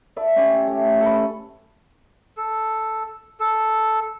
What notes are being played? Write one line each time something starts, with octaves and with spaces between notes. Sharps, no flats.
D5 E5 A5
C#4 G4 C#5
A3
A4 B4
A4
A4